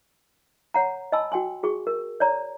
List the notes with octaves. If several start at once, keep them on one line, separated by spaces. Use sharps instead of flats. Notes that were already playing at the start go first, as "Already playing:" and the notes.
C#5 F#5 A#5
D#5 G#5 A5 B5 C6 E6
F#4 G5 G#5 C6
F#4 G#4 C#6
A#4
C#5 D5 A#5